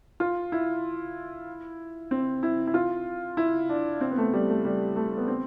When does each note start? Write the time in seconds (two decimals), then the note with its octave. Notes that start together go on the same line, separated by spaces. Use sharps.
0.20 F4
0.52 E4
2.11 C4
2.43 E4
2.67 E4
2.74 F4
3.37 E4
3.69 D4
4.01 C4
4.11 B3
4.18 A3
4.33 G3
4.49 A3
4.65 G3
4.96 A3
5.17 B3
5.28 C4